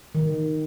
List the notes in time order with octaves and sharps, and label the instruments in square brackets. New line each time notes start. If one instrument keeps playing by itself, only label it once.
[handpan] D#3